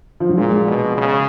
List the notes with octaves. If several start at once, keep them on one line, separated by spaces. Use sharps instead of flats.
F3
F#3
A#2 G#3
B2
C#3